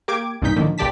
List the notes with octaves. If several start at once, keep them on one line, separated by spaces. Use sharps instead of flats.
A#3 G4 D6 G#6
C2 G2 A#2 D#4 G6 B6
A2 D3 D#3 F3 A#3
B1 A#2 G4 D5 A5 B6